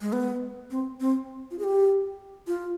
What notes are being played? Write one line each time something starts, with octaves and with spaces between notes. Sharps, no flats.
G#3
B3
C4
C4
F4
G#4
G4
F4